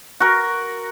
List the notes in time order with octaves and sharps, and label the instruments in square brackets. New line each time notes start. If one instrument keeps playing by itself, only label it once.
[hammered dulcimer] F#4 A#4